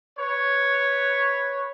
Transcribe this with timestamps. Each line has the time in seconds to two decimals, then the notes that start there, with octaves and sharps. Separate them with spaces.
0.18 B4 C#5